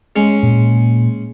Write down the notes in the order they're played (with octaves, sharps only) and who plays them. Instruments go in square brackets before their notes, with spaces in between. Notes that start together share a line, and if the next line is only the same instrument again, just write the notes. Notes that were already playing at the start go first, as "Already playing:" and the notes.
[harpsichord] G#3 C#4
[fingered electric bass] A#2